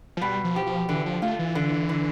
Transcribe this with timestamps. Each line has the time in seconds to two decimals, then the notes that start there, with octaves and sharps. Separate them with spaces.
0.17 F3
0.21 B2 G3
0.44 F3
0.56 G4
0.66 F3
0.89 D3 E3
1.06 F3
1.22 A3 F4
1.39 E3
1.55 D3
1.89 D3